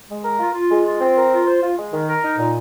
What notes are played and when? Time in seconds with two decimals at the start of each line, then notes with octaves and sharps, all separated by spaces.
0.08 G#3
0.23 A#4
0.39 F4
0.54 F4
0.70 G#3
0.85 F4
1.00 C4
1.16 A#4
1.31 F4
1.46 C5
1.61 F4
1.77 G#3
1.92 D#3
2.07 A#4
2.23 D#4
2.38 A#2